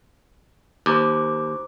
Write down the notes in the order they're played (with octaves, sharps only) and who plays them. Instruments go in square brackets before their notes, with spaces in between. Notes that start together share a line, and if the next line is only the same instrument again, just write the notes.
[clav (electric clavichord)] D#2 [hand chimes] C5 A#5 D6